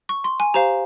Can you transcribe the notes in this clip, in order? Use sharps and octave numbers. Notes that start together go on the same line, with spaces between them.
C#6
C6
G#5
G4 C5 F5 A#5